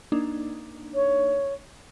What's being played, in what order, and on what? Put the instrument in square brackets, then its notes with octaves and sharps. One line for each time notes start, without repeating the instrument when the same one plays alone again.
[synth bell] A#3 D4 D#4
[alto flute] C#5